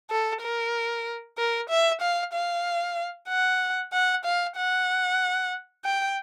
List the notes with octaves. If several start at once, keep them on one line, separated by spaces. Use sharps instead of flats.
A4
A#4
A#4
E5
F5
F5
F#5
F#5
F5
F#5
G5